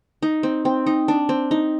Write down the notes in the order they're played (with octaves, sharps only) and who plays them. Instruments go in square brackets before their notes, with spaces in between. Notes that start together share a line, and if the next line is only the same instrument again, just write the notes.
[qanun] D#4
C4
C4
D#4
D4
C4
D#4